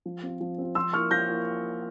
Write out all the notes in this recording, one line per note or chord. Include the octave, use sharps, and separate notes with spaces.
F3
C4 F4
F3
C4 F4
F3 C6 E6
A#3 E4 C#6 F6
F3 G6 A#6
A#3 E4